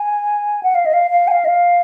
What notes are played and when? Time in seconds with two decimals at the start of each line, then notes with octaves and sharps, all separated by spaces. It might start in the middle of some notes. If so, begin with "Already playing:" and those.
Already playing: G#5
0.63 F#5
0.75 F5
0.86 D#5
0.93 F5
1.11 F5
1.28 G#5
1.31 F5
1.45 D#5
1.48 F5